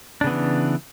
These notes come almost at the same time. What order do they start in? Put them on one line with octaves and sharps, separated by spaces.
D4 C#3 B3 E3